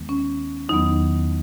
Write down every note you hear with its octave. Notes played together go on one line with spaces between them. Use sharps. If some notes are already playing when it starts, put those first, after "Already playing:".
Already playing: D#2 D#3 G#3 B3
C#4
E2 D#3 F#3 B3 D#4